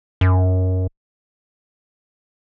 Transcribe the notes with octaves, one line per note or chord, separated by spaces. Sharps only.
F#2